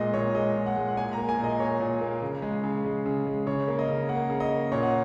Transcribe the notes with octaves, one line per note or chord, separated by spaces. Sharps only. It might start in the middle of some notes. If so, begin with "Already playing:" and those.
Already playing: A#2 G#3 D#5
A#2 C#5
G#3 D#5
A#2
F#5
G#3
F#5
A#2 G#5
A#3 A#5
G#5
A#2
D#5
A#3 C#5
A#2
A#3
C#3
G#3
C#3
G#3
C#3
G#3
C#3 C#5
A#3
D#5
C#3
A#3 F#5
C#3
D#5
A#3
A#2 C#5
F#5